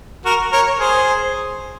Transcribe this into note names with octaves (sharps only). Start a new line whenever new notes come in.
F#4 A#4
A#4 C#5
G#4 C5